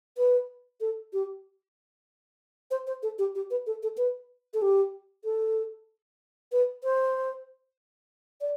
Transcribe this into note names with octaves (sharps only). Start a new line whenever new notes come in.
B4
A4
G4
C5
C5
A4
G4
G4
B4
A4
A4
B4
A4
G4
A4
B4
C5
D5